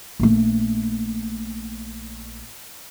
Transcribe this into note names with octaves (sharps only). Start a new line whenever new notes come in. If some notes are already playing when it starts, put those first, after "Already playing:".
A#1 A3